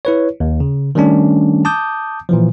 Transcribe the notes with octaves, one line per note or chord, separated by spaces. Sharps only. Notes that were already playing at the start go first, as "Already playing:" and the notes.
E4 B4 C#5
D#2
C#3
D#3 G3 A3 C#4 D4
A5 D6 D#6 G6
A#2 E3 F3